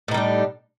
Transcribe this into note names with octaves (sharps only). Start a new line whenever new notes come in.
A2 G3 D4 D#4